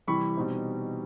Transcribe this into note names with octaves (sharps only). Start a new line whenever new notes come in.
C3 E3 G3 B5 C#6
B2 G3 C4 D#4